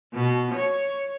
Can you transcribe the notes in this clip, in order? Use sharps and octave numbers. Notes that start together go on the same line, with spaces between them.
B2
C#5